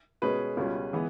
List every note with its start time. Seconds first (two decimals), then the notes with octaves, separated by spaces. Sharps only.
0.22 B2 G#3 C#4 B4
0.57 C#2 B2 G3 C#4
0.93 E3 G#3 B3